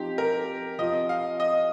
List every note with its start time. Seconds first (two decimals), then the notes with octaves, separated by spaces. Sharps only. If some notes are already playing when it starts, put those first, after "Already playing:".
Already playing: F3 C4 D#4 G4
0.18 A#4
0.78 F3 C4 F4 D#5
1.09 F5
1.40 D#5